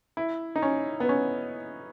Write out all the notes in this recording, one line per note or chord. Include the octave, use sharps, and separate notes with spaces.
E4
D#4
C#4
B3
C#4